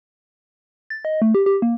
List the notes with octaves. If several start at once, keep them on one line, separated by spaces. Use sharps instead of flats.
A6
D#5
A3
G4
G4
A#3